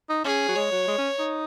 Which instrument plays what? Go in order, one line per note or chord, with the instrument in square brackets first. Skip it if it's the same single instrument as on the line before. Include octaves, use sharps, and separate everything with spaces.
[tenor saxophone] D#4
[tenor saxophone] C#4 [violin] G#4
[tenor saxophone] F#3
[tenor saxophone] G#3 [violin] C#5
[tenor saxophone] F#3
G#3
C#4
D#4